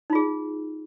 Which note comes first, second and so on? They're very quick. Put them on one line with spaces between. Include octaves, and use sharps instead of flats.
D#4 F4 G#4